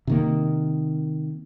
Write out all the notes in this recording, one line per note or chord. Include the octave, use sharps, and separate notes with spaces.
C3 D#3 A#3